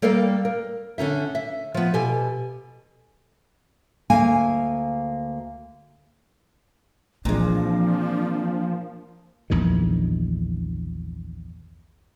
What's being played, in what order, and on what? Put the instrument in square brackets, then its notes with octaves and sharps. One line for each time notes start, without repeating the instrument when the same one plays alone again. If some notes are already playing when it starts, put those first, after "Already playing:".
[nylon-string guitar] G3 A#3 A4 A#4 F5 G5
A#4
D3 C#4 D#4 E5
E5
F3 B3
B2 G4 A4 G#5
D2 A#3 F5 G#5
[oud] A#2 G#3 [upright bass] E3 C4 [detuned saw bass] F3 [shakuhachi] D4
[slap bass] A#1 E2 G2 D#3